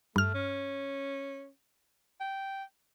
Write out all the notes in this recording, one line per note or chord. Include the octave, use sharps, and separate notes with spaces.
G2 A3 F6
C#4
G5